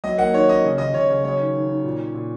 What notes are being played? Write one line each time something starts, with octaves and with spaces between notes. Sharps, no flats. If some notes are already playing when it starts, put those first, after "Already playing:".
F#3 D#5
A#3 F#5
D#3 C#5
C#4 D#5
C#3
C#3 D#5
C#3 C#5
C#3
F#3 C#5
D#3
D#3
D#3
A#2
C#4
A#2